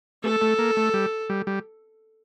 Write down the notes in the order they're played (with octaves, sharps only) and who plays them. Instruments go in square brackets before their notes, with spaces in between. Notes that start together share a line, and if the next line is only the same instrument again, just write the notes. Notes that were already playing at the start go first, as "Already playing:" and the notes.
[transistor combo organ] A3 [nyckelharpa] A4
[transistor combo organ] A3
A#3
A3
G3
G3
G3